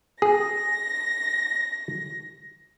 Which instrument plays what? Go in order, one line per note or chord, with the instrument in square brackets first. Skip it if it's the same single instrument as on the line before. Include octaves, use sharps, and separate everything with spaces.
[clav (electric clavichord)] G#4 [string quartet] A#6